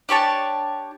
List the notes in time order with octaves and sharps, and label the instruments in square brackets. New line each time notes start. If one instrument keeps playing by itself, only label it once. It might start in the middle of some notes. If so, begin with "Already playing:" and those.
[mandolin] D4 G4 C#5 A5